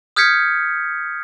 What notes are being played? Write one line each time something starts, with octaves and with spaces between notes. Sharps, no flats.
D#6 F6 G6 G#6 B6 C#7